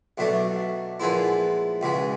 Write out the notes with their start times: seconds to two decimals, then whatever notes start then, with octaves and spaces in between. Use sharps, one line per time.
0.18 B1 B2 F#3 A3 D4
1.00 A#2 F3 G#3 B3 E4
1.81 C#2 B2 G#3